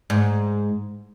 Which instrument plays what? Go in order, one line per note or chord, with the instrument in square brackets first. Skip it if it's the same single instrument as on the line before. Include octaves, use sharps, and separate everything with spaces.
[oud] G#2